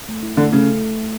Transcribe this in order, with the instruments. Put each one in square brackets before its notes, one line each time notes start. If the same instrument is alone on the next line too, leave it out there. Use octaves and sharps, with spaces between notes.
[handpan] A3
E4
[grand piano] D3 [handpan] A3
[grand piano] C#3 [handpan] A3